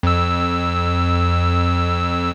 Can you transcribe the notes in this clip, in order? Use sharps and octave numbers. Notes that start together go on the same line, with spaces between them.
F2 E6